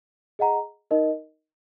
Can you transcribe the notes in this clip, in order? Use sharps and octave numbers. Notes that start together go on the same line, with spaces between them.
G#4 D#5 F#5 A#5
D#4 A#4 D#5